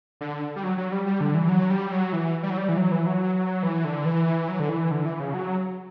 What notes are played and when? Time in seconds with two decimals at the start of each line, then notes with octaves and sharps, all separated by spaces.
0.21 D3
0.56 G3
0.63 F#3
0.78 F#3
0.92 G3
1.06 G3
1.21 D3
1.35 E3
1.49 F#3
1.70 G3
1.92 F#3
2.13 E3
2.43 G3
2.50 F#3
2.58 G3
2.69 E3
2.77 F#3
2.91 E3
3.06 F#3
3.63 E3
3.85 D3
4.05 E3
4.48 F#3
4.60 D3
4.69 E3
4.91 D3
5.05 E3
5.20 C#3
5.34 F#3